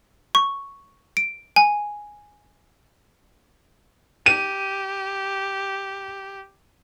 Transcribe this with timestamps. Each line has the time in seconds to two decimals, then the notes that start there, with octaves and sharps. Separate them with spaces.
0.35 C#6
1.17 D7
1.56 G#5
4.26 G4 D#7